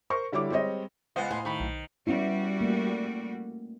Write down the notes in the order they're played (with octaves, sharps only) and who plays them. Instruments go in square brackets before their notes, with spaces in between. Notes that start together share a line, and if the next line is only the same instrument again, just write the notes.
[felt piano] A#4 C5 C#6
D3 G3 E4 C#5 D6
G3 G#3 C4 C#5 D#5
[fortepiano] C#2 F5 [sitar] B3 C5 [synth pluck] D#5 F#5
[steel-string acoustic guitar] A2 F5 [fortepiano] G#5 C6
[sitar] D#3 [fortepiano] B5 C#6
[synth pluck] B1
[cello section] G3 F#4 [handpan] B3 C#4 E4
[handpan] A3 A#3